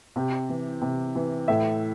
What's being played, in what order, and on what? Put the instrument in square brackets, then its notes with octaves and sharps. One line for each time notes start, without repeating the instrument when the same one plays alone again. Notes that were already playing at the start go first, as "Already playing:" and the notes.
[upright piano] C3 G4
E3
C3
E3
A2 E5